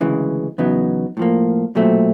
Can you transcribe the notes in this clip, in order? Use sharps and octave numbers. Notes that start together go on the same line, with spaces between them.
D2 C#3 E3 G#3
E2 C#3 F#3 B3 D#4
A2 F3 A#3
B1 A#2 F#3 A3 C4